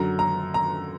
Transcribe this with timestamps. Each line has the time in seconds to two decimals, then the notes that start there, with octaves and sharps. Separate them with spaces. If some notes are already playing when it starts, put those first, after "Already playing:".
Already playing: F#2 D3 F#3 A#5
0.19 A#5
0.54 A#5